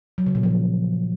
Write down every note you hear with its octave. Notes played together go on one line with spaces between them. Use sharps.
F#3
C#3
A#2
F3